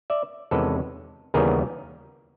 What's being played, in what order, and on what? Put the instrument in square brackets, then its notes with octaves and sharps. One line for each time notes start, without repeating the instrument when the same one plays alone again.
[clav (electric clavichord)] D5 E5
E2 C3 D#3 G#3 C#4 A4 B4
D#2 C#3 E3 G3 B3 G#4 A#4